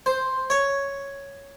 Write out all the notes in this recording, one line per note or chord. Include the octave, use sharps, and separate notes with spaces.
C5
C#5